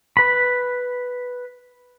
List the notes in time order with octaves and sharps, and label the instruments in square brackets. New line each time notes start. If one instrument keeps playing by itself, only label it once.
[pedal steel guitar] B4 B5